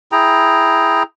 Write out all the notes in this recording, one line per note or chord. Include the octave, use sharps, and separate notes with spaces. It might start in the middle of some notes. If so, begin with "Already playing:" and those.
E4 G#4 G5 A#5